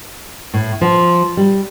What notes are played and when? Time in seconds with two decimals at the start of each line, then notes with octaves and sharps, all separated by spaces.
0.54 A2
0.81 F3
1.37 G3